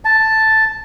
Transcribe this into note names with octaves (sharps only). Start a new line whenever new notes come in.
A5